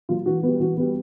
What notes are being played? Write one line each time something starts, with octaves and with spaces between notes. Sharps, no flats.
F#3 A#3 F4
E3 F#4
G3 B3
E3 F#4
G3 B3